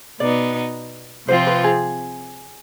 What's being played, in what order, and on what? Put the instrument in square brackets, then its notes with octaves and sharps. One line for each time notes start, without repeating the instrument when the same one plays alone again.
[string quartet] B2 B3 D#4 [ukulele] D5
[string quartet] C3 F3 C4 F4 [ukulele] C5
[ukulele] B4
G#4